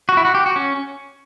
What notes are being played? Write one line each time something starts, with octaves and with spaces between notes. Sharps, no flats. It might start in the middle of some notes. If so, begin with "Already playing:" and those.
F#4
E4
F#4
G4
F#4
C#4